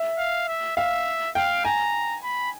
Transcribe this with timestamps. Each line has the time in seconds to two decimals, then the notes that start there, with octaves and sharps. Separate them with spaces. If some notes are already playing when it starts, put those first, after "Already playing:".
Already playing: E5
0.18 F5
0.48 E5
0.77 E5 F5
1.35 F5 G5
1.65 G#5 A#5
2.24 B5